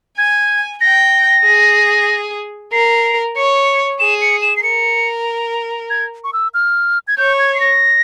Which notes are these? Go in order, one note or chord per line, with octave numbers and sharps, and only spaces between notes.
G#5 G#6
G5 A#6
G#4
A#4 C7
C#5 C#7
G#4 E7
C#7
E7
C7
A#4 C#7
G#6
C#6
E6
F6
G#6
C#5 G6
G#6
C7
A#6